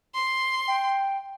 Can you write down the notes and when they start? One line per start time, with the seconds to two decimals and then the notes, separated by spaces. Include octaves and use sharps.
0.14 C6
0.68 G5